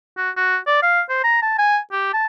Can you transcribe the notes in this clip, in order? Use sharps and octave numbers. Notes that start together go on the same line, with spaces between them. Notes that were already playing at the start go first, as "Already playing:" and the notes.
F#4
F#4
D5
F5
C5
A#5
A5
G#5
G4
A5